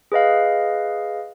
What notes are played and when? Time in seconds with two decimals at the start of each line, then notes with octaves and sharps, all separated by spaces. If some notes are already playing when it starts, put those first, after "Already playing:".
0.12 G#4 B4 D#5 F5